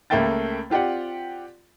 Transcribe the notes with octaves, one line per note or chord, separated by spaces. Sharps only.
C#2 A3 A#3 E5 G5 A6
C4 F4 G4 D5 F#5